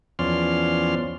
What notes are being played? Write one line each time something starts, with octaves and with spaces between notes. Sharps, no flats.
E2 F3 C#4 D5 C6 F6